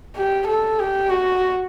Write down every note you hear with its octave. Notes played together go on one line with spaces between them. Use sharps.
G4
A4
G4
F#4